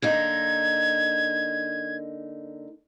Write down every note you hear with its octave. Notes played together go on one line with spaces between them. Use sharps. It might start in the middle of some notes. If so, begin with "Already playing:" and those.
D3 A#3 D#4 G#6